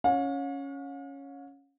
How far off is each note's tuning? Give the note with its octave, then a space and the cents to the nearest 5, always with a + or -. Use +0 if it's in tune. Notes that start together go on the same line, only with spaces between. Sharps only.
C#4 +0 F5 +45